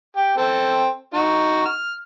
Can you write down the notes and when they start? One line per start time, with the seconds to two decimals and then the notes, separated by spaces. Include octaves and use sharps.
0.17 G4
0.38 C4 A4
1.14 D#4 F#4
1.66 F6